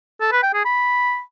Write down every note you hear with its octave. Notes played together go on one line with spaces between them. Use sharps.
A4
B4
G5
G#4
B5